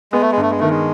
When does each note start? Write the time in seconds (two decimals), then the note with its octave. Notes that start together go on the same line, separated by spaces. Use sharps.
0.12 G#3 B3
0.21 A3
0.32 G#3
0.37 G2 A3
0.50 G#3
0.60 D#3 A3
0.69 G#3